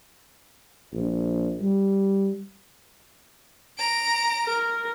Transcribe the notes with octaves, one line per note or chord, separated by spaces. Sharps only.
A#1
G3
A#5 D7
A#4